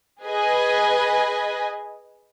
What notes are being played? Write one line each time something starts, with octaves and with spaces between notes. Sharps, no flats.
G#4 B4 D#5 G#5